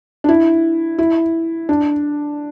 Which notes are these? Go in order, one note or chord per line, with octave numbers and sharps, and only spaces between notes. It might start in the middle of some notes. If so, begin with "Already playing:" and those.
D4
E4
E4
D4